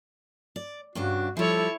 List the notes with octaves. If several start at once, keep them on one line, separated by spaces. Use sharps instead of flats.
D5
G2 C#3 D4 F#4
F3 G3 E4 A4 C#5